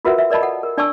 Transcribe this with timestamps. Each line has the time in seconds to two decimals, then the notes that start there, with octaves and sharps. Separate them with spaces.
0.05 F4 F#4 A#4 B4 E5 F#5
0.18 E5
0.30 A#4 D5 D#5 A5 B5
0.42 A4 F#5
0.63 A#4
0.77 D4 D5 G#5 A5 C#6 E6